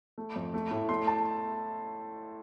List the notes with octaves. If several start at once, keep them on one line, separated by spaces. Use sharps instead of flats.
A3
F2
A3
A2
A3 C6
A5